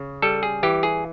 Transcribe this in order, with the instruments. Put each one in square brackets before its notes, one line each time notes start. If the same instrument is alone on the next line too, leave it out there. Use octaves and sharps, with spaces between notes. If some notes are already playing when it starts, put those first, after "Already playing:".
Already playing: [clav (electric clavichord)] C#3
G3 A4
G#4
E3 G4
G#4